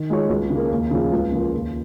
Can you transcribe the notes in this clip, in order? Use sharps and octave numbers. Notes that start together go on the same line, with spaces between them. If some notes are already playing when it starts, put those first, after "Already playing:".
Already playing: D#3
G#3 F4 C#5
C#2
C#3
A#3
D#2
C#3 F3
C#2
C#3 F3 A#3 F4
D#2